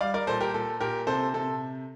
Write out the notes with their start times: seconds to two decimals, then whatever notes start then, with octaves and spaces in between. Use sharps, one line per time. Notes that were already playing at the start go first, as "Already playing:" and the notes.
0.01 G3 D5 F5
0.14 A#4 D5
0.27 A#2 A4 C5
0.40 G4 A#4
0.54 A#2 A4
0.80 A#2 G4 A#4
1.07 C3 A4 C5
1.34 C3 A4